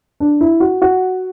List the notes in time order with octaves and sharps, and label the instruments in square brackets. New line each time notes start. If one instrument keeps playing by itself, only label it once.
[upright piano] D4
E4
F#4
F#4